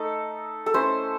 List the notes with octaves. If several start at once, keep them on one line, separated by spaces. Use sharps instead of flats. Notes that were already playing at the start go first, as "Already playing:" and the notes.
Already playing: A3 D#4 A4
A4
A3 C#4 E4 C5